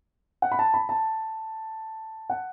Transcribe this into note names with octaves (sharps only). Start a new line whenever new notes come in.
F#5
B5
A5
B5
A5
F#5